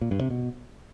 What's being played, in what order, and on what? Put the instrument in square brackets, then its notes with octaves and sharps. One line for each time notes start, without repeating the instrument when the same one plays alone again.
[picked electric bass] A#2
G2
C3
B2